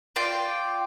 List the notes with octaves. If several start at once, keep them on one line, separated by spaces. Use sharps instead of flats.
F4 D5 G5